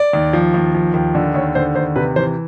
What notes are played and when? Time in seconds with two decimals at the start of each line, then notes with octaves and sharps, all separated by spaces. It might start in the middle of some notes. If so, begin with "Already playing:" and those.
Already playing: D5
0.13 D#2
0.33 F3
0.54 D#2
0.75 F3
0.94 D#2
1.15 D3
1.34 D#2 C#5
1.55 D3 C5
1.75 D#2 C5
1.96 C3 B4
2.16 E3 C5